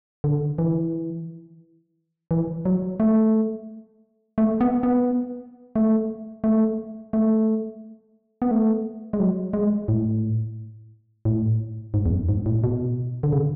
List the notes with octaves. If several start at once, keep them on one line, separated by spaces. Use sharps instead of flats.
D3
E3
E3
F#3
A3
A3
B3
B3
A3
A3
A3
B3
A3
G#3
F#3
G#3
A2
A2
G#2
E2
F#2
G#2
A2
B2
D3
C#3